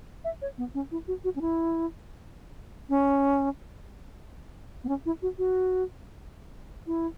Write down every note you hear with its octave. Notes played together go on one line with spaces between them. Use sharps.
E5
C#5
B3
C#4
E4
F#4
F#4
C#4
E4
C#4
B3
C#4
E4
F#4
F#4
E4